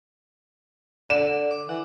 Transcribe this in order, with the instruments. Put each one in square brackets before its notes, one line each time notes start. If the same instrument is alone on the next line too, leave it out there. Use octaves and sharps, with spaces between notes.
[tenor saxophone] D3 [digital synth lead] D5 [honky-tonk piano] E7
[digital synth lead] D6
[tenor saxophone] E3 [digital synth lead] F#5